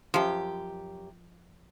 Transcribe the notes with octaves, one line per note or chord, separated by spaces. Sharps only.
F#2 F3 G4